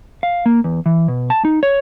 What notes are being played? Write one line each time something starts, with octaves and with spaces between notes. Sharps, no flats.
F5
A#3
E2
E3
B2
A5
D#4
C#5